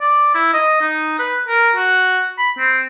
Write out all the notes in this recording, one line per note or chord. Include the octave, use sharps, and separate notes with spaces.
D5
E4
D#5
D#4
B4
A#4
F#4
B5
C4